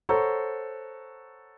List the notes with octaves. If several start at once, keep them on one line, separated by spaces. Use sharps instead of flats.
A4 C5 C#5 F#5 A#5 C#6